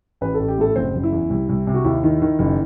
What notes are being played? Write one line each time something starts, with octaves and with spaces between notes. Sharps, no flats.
A1 B4
A1 A4
G4
A2 A3 A4
F#1 C4 C5
F#1
E4
E2
C2
C2
C3
F#4
D#2 E4
D#3
D#3
F#1